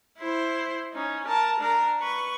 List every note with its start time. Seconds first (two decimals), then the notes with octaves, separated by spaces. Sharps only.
0.18 E4 C5
0.92 C#4 D#4
1.26 A#4 A5
1.60 D4 A#4
2.00 B4 C#6